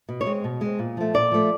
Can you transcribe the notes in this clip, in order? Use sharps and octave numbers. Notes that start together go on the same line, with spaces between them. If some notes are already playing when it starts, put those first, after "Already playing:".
B2
C#5
G#3 C4
B2
G#3 C4
A#2
F3 A3
A#2 D5
F3 A3